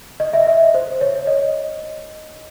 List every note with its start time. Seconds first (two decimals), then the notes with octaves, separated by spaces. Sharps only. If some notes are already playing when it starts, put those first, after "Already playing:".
0.20 D#5
0.33 E5
0.47 D#5
0.74 C5
1.01 C#5
1.27 D#5